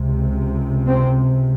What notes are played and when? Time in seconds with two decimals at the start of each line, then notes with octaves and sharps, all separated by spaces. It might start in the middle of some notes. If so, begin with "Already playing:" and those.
Already playing: C#2 C3
0.87 C4